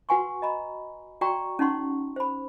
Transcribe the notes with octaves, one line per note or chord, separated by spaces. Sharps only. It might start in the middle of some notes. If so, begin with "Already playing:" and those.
F#4 B4 F#5 G#5 C6 C#6
D#5 A#5 B5
F#4 D5 G5 A#5 C#6
C#4 D#4 F#5 C6 C#6
C5 B5